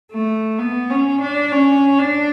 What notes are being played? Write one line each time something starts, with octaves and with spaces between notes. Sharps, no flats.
A3
B3
C#4
D4
C#4
D4